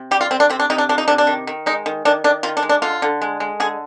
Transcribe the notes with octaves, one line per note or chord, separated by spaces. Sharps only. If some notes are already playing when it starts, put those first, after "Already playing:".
Already playing: C3
G3 G4
F4
C3 C4
D4
C3 C4
D4
C3 D#4
D4
F3 D4
D#4
C3 D4
D4
D#3
D#3
G#3 D#4
D#3
D#3 D4
D#3 D4
D#3 F4
D4
G#3
D4
D3 F4
D3
G#3
G#3
D3 G#4